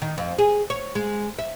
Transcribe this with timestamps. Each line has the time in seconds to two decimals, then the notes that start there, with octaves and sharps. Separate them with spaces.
0.02 D#3
0.18 F2
0.38 G#4
0.70 C#5
0.95 G#3
1.38 E5